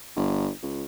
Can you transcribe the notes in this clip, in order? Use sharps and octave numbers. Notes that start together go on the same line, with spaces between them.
G1
C#2